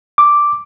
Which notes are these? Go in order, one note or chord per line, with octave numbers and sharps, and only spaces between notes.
D6